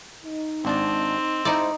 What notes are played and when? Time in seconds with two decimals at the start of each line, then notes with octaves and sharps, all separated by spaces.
0.25 D#4
0.65 G#1 C4 D4 A5
1.45 G#2 D#4 E4 C5 D5